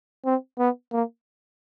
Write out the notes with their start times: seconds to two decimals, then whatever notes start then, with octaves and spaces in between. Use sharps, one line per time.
0.25 C4
0.59 B3
0.92 A#3